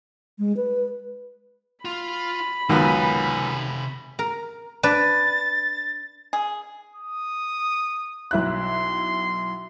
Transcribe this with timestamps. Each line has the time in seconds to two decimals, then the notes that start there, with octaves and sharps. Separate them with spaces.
0.39 G#3
0.57 B4
1.85 F4 B5
2.69 C#2 F#2 C3 D#3 B3 G#5
4.19 A#4
4.83 D4 B4 A6
6.33 G#4
6.96 D#6
8.31 B1 E4 C6 F#6